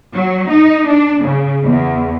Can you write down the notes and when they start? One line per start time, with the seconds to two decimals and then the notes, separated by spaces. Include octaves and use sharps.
0.14 F#3
0.50 D#4
0.89 D4
1.23 C#3
1.65 E2